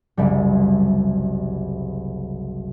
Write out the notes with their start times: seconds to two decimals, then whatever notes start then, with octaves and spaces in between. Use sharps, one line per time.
0.17 F#1 C2 G3